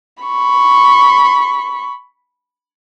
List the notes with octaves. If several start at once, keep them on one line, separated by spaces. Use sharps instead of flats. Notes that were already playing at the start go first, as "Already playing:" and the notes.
B5 C#6